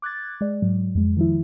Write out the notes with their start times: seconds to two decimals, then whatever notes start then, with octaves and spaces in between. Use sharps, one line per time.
0.02 D6 F#6 G#6 A6
0.41 G#3 D5
0.62 G#2 F#3
0.95 F2 G#3
1.17 D#3 F3 E4